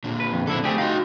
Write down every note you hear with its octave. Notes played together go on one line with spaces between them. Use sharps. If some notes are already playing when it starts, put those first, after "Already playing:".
A#2 D3
B4
F2
D3 C4 E4 A4
A3 C4 G4 G#4
D#4 F#4 F5